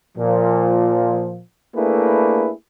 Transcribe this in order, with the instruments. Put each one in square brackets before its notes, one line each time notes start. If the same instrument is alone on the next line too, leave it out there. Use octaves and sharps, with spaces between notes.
[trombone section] A#2 F3
A3 A#3 D4 E4 G#4 B4